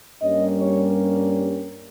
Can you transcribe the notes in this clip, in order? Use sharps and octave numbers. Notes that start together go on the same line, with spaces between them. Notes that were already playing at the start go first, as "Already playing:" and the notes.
G2 G3 A#3 C#4 D#5
C#5